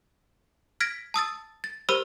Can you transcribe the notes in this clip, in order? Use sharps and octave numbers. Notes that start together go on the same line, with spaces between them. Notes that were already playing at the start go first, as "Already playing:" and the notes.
F6 G#6 A#6 B6 D7
A5 D#6 E6 A6
A6
G4 A#4 C5 B5 E6 F6